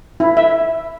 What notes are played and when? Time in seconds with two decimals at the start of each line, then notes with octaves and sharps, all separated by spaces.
0.20 E4
0.37 E5